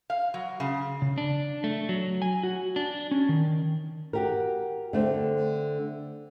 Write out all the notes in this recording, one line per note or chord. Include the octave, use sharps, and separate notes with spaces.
F5
F#3
C#3
C#3
D4
A3
F#3
G#5
F#4
D4
C#4
D#3
F#4 G4 A#4
D3 A3 C4